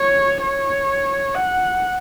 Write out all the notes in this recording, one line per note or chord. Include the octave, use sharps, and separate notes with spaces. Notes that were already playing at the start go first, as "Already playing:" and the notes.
Already playing: C#5
C#5
F#5